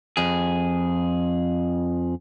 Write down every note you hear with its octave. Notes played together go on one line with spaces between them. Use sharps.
F2 G#4